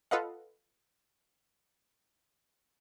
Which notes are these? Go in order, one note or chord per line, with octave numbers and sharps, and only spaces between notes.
F4 A4 B4 D#5 F5 F#5